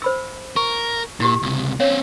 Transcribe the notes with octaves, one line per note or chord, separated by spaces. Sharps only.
C5 B5 E6
A#4 C#6
A#2 E4 F#4 G4
C#2 C3
C4 C#4 C#5 F5